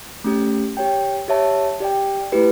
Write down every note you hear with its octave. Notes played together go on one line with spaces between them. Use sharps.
A3 C#4 G4
G4 C#5 G5
G4 C#5 E5 A5
G4 D5 G5
A3 E4 G4 B4